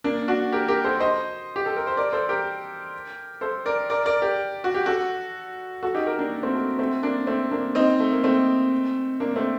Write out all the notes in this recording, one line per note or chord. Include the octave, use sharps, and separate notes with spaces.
A#3 D4
D4 F#4
G4 A#4
G4 A#4
A4 C5
C5 D#5
G4
A4
A#4
C5
A#4 D5
A4 C5
G4 A#4
A4 C5
A#4 D5
A#4 D5
A#4 D5
G4 A#4
F#4
G4
F#4 A4
F#4 A4
D#4 G4
G4 A#4
A#3 D4
A3 C4
A3
A3 C4
A#3 D4
A3 C4
A#3 D4
C4 D#4
A3
A#3
A3 C4
A#3 D4
A3 C4